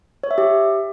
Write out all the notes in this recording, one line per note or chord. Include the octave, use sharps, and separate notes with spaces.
C#5
E5
G4